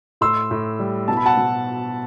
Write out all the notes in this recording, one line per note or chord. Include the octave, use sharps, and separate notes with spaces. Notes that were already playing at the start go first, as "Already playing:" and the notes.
A2 C6 E6
A2
G3
B2 A5
B5
F#5 A5
B2